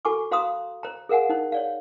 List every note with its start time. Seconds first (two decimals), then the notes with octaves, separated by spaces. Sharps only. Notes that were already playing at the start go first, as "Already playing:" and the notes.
0.05 F#4 A4 G#5 C#6 D6
0.31 F#4 C5 F5 A#5 C6 D#6
0.83 C5 A#5
1.09 G#4 A#4 F5 F#5 G#5
1.29 D#4 C5
1.52 C#5 D5 F5